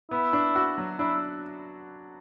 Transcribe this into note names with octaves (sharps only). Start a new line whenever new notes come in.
B3 E4
D4
F#4
F#3
D4 E4